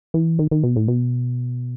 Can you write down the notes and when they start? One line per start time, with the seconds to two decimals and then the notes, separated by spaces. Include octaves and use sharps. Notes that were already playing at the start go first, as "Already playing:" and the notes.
0.14 E3
0.39 D#3
0.51 D#3
0.64 B2
0.76 A2
0.88 B2